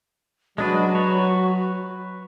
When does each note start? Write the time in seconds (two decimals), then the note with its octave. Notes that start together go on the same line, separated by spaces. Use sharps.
0.58 F#3 G#3 D4 F#4 B4
0.95 B4 C#5